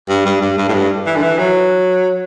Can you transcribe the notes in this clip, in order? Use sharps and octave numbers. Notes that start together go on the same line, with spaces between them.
G2
G2
G2
G2
A2
G2
E3
D3
E3
F#3